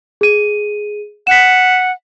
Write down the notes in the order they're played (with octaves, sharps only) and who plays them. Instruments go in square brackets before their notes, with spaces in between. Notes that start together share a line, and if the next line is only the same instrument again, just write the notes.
[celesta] G#4 D#7
[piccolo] F#5 [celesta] B6 E7